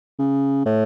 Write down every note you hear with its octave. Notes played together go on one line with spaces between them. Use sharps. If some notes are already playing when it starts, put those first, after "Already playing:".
C#3
A2